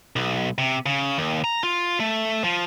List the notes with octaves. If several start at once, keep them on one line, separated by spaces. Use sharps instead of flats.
B1
C3
C#3
D#2
A#5
F4
A3
F3